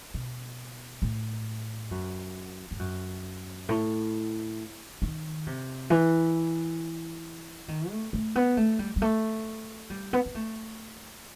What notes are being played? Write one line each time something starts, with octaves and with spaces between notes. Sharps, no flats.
B2
A2
F#2
G2
F#2
A2
D#3
C3
E3
D#3
A3
A3
B3
A3
G3
G3
A3
G3
B3
B3
A3